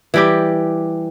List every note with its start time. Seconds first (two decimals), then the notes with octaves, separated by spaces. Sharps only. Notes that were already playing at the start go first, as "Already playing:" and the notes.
0.14 E3 G3 G4